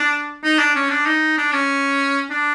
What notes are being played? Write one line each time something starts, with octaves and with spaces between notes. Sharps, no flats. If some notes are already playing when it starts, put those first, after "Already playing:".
Already playing: D4
D#4
D4
C#4
D4
D#4
D4
C#4
D4